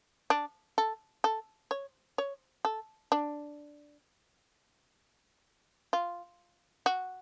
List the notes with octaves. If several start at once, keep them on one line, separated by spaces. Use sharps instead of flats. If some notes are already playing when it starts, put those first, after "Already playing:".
D4
A4
A4
C#5
C#5
A4
D4
F4
F#4